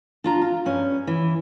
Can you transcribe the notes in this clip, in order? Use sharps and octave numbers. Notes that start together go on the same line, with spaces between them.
D4 F4 A#5
F4
G2 C#4
E3